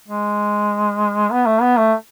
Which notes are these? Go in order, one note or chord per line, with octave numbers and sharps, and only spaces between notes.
G#3
B3
A3
B3
A3